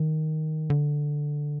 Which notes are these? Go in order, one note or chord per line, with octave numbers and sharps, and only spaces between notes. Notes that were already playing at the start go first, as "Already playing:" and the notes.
Already playing: D#3
D3